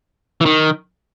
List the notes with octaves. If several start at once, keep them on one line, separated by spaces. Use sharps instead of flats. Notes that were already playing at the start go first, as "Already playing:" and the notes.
E3
D#3